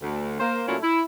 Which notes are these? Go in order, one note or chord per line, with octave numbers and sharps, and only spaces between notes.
D2
A#3 C5
A#2 F#3 A3 C#4 E4 F4
E4